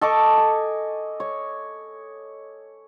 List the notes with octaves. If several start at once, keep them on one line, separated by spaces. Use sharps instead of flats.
A4 D#5 C#6 D6
G#5
C#5